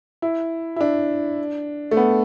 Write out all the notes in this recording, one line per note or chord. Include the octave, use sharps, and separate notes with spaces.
E4
E4
D4
A3
B3